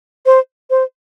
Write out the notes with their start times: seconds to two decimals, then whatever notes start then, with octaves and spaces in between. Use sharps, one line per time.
0.26 C5
0.70 C5